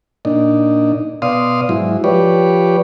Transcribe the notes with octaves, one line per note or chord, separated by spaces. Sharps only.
A#2 D4 D#4
B2 D5 F5 C6 D#6
G#2 F#3 E4
F3 G4 B4 C#5 D5